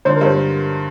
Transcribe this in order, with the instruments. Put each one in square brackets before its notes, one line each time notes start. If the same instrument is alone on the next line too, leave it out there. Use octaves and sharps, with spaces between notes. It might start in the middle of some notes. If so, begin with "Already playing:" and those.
[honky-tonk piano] D3 [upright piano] C5
[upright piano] A#4
[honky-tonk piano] G2
[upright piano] C5